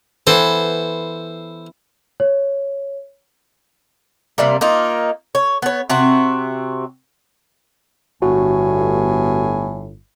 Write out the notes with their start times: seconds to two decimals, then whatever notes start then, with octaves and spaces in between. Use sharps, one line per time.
0.27 E3 B3 A4 C5
2.20 C#5
4.38 C3 G3 A#3
4.61 A#3 D#4 F4
5.35 C#5
5.62 B3 C#5
5.90 C3 C4 F#4
8.22 G1 A2 F#4 G#5